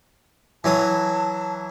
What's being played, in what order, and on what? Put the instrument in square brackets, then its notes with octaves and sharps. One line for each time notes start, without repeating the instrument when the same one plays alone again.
[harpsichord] E3 F#3 D#6 [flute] A5